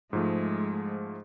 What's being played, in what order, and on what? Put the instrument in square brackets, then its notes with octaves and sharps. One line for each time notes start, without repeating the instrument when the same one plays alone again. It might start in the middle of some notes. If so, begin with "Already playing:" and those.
[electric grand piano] G#2 F3 A3 [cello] G#3